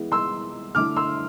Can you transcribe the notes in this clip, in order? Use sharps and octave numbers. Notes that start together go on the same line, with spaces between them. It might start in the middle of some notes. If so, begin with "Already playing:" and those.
Already playing: E3 G#3 B3 E4
C6 E6
D3 A3 E4 D6 F6
C6 E6